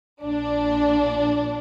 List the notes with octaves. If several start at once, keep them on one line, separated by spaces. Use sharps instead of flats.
A#1 A#2 D4